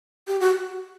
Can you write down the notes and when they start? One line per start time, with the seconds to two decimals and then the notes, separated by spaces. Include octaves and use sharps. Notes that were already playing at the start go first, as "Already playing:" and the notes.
0.27 G4
0.40 F#4